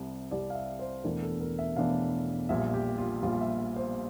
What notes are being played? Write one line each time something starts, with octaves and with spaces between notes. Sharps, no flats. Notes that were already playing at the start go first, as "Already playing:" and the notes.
Already playing: C2 C3 G3
C2 C3 G3 D5
F5
E5
C5
E1 E2 E3 A3 D4 A#4
A4
A#4
E5
E1 E2 E3 A3 D4 F5
A#1 A#2 G3 E5
G4
F4
A#1 A#2 G3 F4
E5
E5
C5